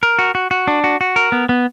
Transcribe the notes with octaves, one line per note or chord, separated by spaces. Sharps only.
A#4
F#4
F#4
F#4
D4
F#4
F#4
A#4
B3
B3